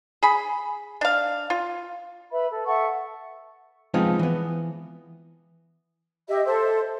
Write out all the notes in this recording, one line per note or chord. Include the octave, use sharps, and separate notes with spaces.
G#4 B5
D4 F5
F4
B4 E5 B5
A4
A4 E5 F#5 C#6
F3 G#3 B3 C4 D#4 F4
E3 B3
G4 D#5 E5
A4 C5 E5 C6